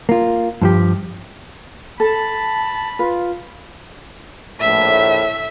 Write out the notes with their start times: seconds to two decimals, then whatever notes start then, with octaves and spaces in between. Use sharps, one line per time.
0.09 A#3 F4
0.62 G2 F3 G4
2.00 A4 A5 B5
2.99 F4 B4
4.60 A#1 A2 E5